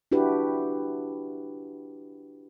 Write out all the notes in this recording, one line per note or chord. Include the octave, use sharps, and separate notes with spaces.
D4 E4 F#4 G4 B4